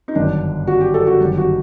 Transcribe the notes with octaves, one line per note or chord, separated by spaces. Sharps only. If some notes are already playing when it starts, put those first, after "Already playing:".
D#4
G1 F#2 D#3 D4
F#4
G4
A4
F#4
G1 F#2 D#3 G4
F#4